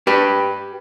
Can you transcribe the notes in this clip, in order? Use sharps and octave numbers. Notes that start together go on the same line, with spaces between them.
G4 B4